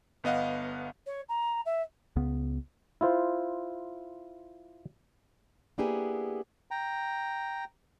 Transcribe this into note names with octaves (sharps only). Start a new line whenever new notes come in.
G1 B3 D#5 F5 F#5
C#5
A#5
E5
C#2 C#3 B3
E4 F4 C5
A#3 B3 D4 E4 G4 G#4
G5 A#5